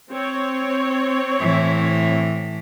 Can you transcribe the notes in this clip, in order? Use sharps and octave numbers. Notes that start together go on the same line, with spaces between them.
C4 C#5
A2 E3